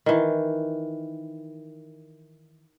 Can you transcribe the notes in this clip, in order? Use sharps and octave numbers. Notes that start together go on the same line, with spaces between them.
D#3 E3